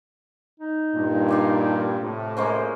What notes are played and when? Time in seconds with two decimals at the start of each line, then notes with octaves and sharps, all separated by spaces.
0.60 D#4
0.95 G2 A#2
1.29 F4 D5 F5
2.01 A2 C3
2.37 G#3 A#3 C#4 C5